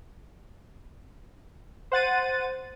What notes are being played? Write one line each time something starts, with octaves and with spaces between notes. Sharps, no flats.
C5 F#5 A6 D#7